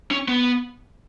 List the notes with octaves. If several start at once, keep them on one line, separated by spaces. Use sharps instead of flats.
C#4
B3